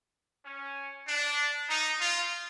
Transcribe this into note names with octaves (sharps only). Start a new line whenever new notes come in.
C#4
D4
D#4
F4